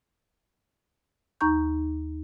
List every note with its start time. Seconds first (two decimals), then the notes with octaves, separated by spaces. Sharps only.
1.41 D#2 D#4 A#5 C#6 G6